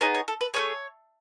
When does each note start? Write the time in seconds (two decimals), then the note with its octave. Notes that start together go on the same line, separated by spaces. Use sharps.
0.01 B3 D#4 G#4 C#5
0.14 C#5
0.28 A4
0.41 B4
0.54 A3 C#4 G#4 C#5